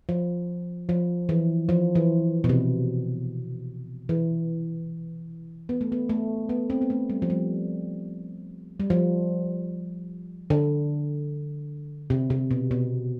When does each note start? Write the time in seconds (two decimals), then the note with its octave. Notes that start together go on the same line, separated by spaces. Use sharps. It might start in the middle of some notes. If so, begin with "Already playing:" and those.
0.09 F3
0.89 F3
1.29 E3
1.69 F3
1.95 E3
2.44 B2
2.49 C3
4.09 E3
5.69 B3
5.81 A3
5.92 B3
6.09 A3
6.49 B3
6.70 C4
6.82 B3
6.90 A3
7.10 G3
7.22 F3
7.30 G3
8.80 G3
8.90 F3
10.50 D3
12.10 C3
12.30 C3
12.51 B2
12.71 B2